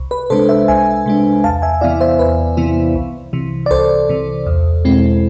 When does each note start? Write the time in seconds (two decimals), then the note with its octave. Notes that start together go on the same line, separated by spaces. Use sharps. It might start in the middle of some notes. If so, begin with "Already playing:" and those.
Already playing: C2
0.11 B4
0.30 C3 G#3 D4 A4 C5
0.49 C5 E5
0.68 C2 E5 G#5
1.06 C3 G#3 D4
1.44 E2 F5 A5
1.62 E5 G#5
1.81 C3 E3 B3 E4 D5 F5
2.01 C5 E5
2.19 E2 B4
2.57 C3 E3 B3 E4
2.95 C2
3.33 C3 E3
3.66 D5
3.71 C2 A4 C5
4.09 C3 E3
4.46 E2
4.85 B2 G#3 C4 E4